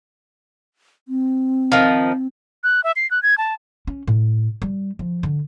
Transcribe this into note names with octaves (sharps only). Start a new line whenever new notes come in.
C4
D#3 F3
F#6
E5
C7
F#6
G#6
A5
C#4
A2
G3
F3
D3